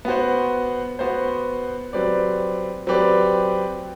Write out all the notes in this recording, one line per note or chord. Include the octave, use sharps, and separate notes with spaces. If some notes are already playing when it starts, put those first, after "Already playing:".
B3 F#4 C5
B3 F#4 C5
F#3 C4 G4 B4 D5
F#3 C4 G4 B4 D5